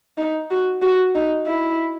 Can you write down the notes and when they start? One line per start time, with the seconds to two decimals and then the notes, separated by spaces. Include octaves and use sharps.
0.18 D#4
0.51 F#4
0.82 F#4
1.15 D#4
1.46 E4